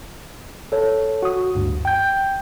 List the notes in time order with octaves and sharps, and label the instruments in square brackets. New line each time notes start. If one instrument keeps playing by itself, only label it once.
[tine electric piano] A4 C#5
F#4 D#6
D2 G2
G5 G6